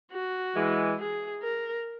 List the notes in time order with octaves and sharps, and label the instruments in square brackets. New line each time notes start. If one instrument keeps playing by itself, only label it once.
[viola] F#4
[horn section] E3 G#3
[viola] G#4
A#4